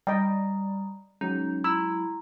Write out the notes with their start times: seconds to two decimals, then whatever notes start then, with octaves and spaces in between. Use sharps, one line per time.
0.07 G3 D5 D#5 G5 A#5 D#6
1.21 F#3 G#3 C#4 D#4
1.64 E4 A#5 C6 E6